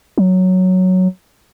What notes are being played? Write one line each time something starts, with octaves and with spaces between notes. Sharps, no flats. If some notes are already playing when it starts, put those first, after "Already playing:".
F#3